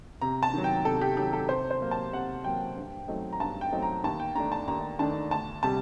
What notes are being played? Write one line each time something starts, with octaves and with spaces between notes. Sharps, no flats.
C3 A#5
A5
D#3 F#3
G5
C3 A4
G4
D#3 F#3 G4
A4
C3 C5
C5
F#3 A#3
A5
C3 F#5
F#3 A#3 G5
G2
F#3 A3 C4 D#4
A#5
G2 A5
G5
F#3 A3 C4 D#4
A#5
D#2 A5
G5
D#3 A3 D4 A#5
A5
D#2 A#5
D#3 A3 D4 A5
D2 A5
C3 G3 A5